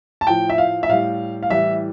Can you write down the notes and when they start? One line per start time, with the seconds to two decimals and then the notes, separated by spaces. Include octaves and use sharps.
0.21 A5
0.27 A2 F3 G5
0.50 E5
0.58 F5
0.83 E5
0.89 A2 G3 F5
1.43 F5
1.50 A2 E3 G3 E5